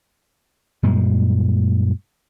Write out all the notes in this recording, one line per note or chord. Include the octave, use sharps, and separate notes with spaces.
F#2 A#2 G3 G#3